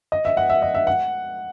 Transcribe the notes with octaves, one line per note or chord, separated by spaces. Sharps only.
D#5
E5
F#5
E5
D#5
E5
F#5